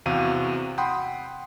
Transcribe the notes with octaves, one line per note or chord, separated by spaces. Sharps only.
E2 C3 F#4 G4 F5 D#7
F#5 G5 B5 C6 D#6